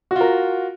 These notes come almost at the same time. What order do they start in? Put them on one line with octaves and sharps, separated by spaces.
F#4 F4 A#4